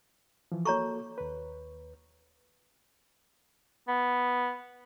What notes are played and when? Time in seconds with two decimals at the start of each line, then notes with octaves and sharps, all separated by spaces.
0.52 E3 F3
0.65 A#3 F#4 A4 C#5 A#5 C#6
1.18 D#2 B4
3.88 B3